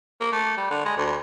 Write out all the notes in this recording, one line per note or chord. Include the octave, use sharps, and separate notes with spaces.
A#3
A3
G3
D3
G#3
D2